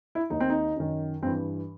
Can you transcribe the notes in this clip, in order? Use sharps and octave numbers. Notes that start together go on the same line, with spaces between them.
E4
D#2 D#3 D#4
C4
D#4
F#2 D#3
G2 E3 C4